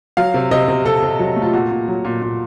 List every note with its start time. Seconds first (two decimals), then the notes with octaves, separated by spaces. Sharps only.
0.17 F#3 F5
0.34 C3
0.51 C3 D#5
0.68 C3
0.86 C3 A4
1.02 C3
1.19 F#3
1.36 A3
1.42 F4
1.53 A#2 F#4
1.71 A#2
1.88 F#3
2.05 A#2
2.22 A#2